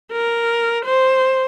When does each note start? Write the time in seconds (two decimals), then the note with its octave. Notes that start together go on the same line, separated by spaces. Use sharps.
0.12 A#4
0.85 C5